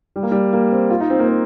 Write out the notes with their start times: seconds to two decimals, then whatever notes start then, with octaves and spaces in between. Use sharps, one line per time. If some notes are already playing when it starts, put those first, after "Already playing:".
0.16 G3
0.23 A#3
0.31 G3
0.53 A#3
0.72 C4
0.90 F4
1.00 D#4
1.10 C4
1.20 A#3
1.28 C4